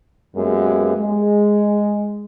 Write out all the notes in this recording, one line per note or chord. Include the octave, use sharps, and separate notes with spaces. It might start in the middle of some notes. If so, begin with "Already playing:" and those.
F#2 G#3 A#3 B3 G4
G#3